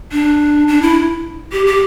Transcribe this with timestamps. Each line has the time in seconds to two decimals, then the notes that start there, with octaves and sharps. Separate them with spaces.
0.12 D4
0.68 D4
0.82 E4
1.52 G4
1.66 G4